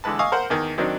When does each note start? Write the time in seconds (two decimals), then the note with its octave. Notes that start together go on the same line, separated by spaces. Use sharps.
0.04 D3 E3 G#3 B4 A5
0.19 D#5 F5 G#5 C#6 D#6 E6
0.32 A#4 C5 F#5
0.50 E2 D#3
0.78 D#3 F#3 C4 D4 D#4